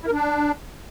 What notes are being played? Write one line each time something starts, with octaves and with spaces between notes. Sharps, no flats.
E4
A#4
D4